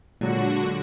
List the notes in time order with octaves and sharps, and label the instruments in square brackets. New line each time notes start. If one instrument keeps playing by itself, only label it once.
[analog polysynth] A#2 F#3 [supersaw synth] D3 F#4 [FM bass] G#3